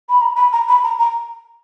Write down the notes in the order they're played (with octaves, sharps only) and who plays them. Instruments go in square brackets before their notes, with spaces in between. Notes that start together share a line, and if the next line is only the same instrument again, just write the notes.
[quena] B5
A#5
B5
A#5
B5
A#5
A#5